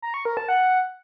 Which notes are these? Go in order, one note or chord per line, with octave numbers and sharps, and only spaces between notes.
A#5
C#6
A#4
A5
F#5